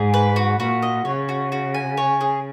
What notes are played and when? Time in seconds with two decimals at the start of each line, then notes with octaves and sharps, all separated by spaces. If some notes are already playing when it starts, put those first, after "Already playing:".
Already playing: G#2 G#4
0.14 B4
0.36 F#4
0.60 A#2 F#4
0.82 D#5
1.05 C#3 C#5
1.29 F#4
1.52 F#4
1.74 G#5
1.97 C#5
2.21 G#4